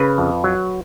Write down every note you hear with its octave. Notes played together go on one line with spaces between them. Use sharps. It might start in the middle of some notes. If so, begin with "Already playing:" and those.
Already playing: C#3 B4
F2
F#3